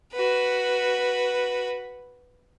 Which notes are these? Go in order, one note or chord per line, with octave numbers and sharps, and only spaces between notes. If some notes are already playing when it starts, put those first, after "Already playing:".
F#4 B4